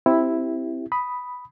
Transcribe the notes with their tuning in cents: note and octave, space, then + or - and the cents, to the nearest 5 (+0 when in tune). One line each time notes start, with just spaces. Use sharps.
C4 +0 E4 +0 G4 -5
B5 +0 D#6 +0